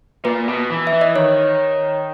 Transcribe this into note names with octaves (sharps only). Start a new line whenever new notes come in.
A#2 B4
B2
E3
E5
E3
D#5
D#3 C#5